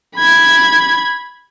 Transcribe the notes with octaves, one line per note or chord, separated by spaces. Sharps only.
B5 G#6